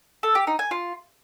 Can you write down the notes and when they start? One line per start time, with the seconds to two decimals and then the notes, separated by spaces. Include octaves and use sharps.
0.23 A4
0.35 G4
0.47 D#4
0.59 G#5
0.71 F4